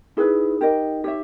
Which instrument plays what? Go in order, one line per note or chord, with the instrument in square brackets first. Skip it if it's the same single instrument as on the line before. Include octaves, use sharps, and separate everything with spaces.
[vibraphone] D#4 [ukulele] E4 G#4 B4
[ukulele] G4 A#4 D#5
G4 C#5 E5